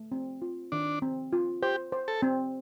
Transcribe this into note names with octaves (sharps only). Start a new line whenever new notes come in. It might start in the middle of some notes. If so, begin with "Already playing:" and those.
Already playing: A3
C4
F4
D#3 D4
C4
F4
G4 C5
C5
A4
C4